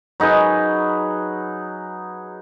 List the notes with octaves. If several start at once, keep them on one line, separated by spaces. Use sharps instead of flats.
F#3 D#4 G#4 B4